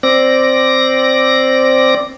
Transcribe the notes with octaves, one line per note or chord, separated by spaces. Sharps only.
C4 D5 A#6